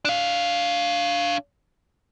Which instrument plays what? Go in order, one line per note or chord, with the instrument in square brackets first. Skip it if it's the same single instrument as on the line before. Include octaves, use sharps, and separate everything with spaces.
[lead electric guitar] D4 F5